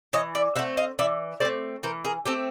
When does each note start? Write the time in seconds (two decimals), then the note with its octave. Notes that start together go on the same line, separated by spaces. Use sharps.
0.13 E3 C#5 D#5
0.35 D5 E5
0.56 A3 C4 E5 F#5
0.77 D#5 F5
0.99 E3 D5 E5
1.40 A3 C4 C5 D5
1.83 E3 A#4 C5
2.05 G#4 A#4
2.25 A3 C4 G4 A4